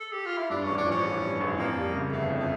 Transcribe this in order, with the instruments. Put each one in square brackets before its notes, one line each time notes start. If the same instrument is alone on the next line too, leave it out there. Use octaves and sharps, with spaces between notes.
[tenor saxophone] A4
G4
F4
E4
[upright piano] G2 [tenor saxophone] D4
[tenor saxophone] C#4
[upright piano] A1
[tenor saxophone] D4
[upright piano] F3 [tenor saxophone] C#4
[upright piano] A1
G2
A1
[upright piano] F2 [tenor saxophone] A#3
[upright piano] G3
C#3
[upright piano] G1 [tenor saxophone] A3
[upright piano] F2
[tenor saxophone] A3